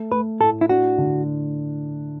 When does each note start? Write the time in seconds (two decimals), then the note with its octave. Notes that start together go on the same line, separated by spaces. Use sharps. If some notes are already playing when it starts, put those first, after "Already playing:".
Already playing: A3
0.12 A3 B4
0.41 A2 A4
0.61 E4
0.69 D4 F#4
0.98 D3